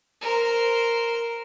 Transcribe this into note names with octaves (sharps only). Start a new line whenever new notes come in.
A#4 C5